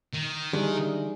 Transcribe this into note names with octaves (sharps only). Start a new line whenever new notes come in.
D#3
D3 E3 G3 D#4 G#4